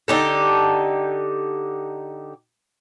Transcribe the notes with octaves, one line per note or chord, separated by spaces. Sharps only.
D3 D#4 G4 A4